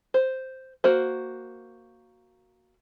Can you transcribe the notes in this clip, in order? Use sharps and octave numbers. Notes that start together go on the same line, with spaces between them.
C5
A#3 F#4 C5